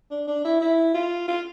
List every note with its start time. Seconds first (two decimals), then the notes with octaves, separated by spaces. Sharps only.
0.11 D4
0.27 D4
0.44 E4
0.61 E4
0.94 F4
1.28 F4